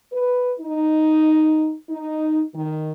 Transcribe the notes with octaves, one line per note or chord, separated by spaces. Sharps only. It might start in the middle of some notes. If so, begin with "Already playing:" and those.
B4
D#4
D#4
D#3